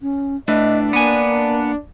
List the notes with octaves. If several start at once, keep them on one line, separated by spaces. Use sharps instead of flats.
C#4
A2 A3 D4 B4 D#5
A#3 B3 G#5